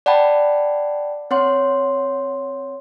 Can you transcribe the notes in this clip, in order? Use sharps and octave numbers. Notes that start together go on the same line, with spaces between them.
D5 F#5 G5 A5 B5
C4 C#5 F#5 C6